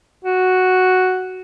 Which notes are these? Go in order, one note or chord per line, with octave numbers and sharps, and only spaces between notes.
F#4